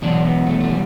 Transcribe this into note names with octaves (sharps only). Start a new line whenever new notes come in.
E2 B2 F#3 D4
B3
A3
A3
G3